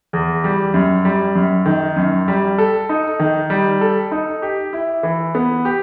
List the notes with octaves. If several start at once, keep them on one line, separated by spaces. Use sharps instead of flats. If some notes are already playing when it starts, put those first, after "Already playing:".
E2
G3
F#2
G3
F#2
D#3
F#2
G3
A4
D#4
D#3
G3
A4
D#4
G4
E4
E3
B3
G4